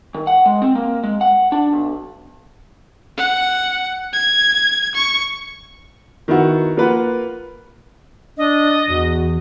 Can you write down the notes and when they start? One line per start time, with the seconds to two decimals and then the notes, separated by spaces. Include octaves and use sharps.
0.15 D#3
0.27 F#5
0.46 G#3
0.62 C4
0.75 A#3
1.03 G#3
1.21 F#5
1.52 D4
1.72 B1
3.17 F#5
4.13 G#6
4.94 C#6
6.28 D#3 B3 E4 F#4
6.77 A#3 F4 A#4 B4 F#5
8.38 D4 D#5
8.89 E2 F#4